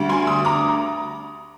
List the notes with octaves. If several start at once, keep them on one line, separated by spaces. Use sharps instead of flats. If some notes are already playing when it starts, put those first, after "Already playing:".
Already playing: D2 D3 G3
G#5 C6
C6 D#6
A#5 D6